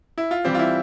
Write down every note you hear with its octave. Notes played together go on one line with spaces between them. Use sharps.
E4
F4
E3 G3 C4 G4
F4
E4